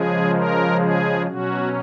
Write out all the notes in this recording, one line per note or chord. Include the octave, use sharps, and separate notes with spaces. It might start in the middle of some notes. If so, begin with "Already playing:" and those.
Already playing: C#3 F3 G#3 G#4
A#4
G#4
B2 F#3 C#4 F#4